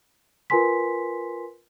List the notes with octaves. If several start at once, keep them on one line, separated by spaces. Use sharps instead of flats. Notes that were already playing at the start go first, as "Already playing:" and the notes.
F4 A#4 B4 G#5 C6 B6